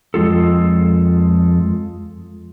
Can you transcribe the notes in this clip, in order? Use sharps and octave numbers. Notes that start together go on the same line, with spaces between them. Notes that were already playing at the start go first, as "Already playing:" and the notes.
F2 G#3 F4 A4